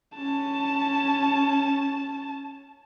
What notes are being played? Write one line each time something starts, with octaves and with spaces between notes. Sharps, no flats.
C#4 A5